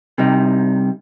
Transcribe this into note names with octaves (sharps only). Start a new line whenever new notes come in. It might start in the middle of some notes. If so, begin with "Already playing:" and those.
C2 C3 G3 D#4